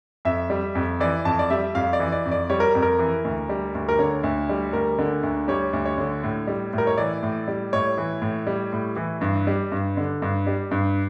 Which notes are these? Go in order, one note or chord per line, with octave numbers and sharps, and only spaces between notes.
F2 E5
G3
F2
E3 D5
F2 A5
D5
G3 E5
F2 F5
D5
E3
D5
F2
D5
G3 C#5
A#4
F2
A#4
E3
D2
G3
D2
A#4
D3 C#5
D2
G3
D2 A#4
D3
D2
G3 C#5
D2
C#5
D3
A2
G3
A2 A#4
C#5
E3 D5
A2
G3
A2 C#5
E3
A2
G3
A2
E3
G2
G3
G2
D3
G2
G3
G2